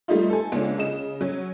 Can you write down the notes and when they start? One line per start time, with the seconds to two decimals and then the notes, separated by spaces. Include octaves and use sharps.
0.08 F3 G3 A3 A#3 D#4 F4
0.30 A4 G#5
0.52 C#2 A#3 C#4 D4
0.78 C#3 D#5 E7
1.21 F#3 C#4